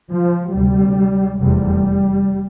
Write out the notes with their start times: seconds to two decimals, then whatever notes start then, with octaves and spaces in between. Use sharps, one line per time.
0.11 F3
0.54 D2 C3 G3
1.38 F1 E2 C3 G3